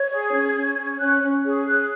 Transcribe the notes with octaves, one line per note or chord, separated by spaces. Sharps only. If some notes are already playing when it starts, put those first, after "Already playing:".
Already playing: C#5 G#6
G#4
C#4
C#4
C#4
C#4 F#6
C#4
G#4
G#4 F#6